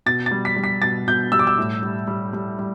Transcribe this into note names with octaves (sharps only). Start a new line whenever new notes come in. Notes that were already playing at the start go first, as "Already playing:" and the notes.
B2 A6
A6
G3
B6
G3
B6
B2 A6
B2 G6
G3 E6
D6
E6
A2
G3
G3
G3
G3